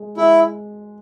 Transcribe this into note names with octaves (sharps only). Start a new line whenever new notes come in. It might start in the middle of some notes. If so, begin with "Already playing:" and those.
Already playing: G#3
G#3 E4